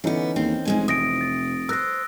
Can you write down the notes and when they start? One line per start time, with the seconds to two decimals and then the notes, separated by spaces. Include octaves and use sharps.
0.04 D3 E3 B3 C#4 D#4
0.36 D#2 C4
0.65 F1 G#2 G#3 G#5
0.88 C3 D#6 A#6 D7
1.21 A6
1.69 A#4 C5 E6 F#6 A#6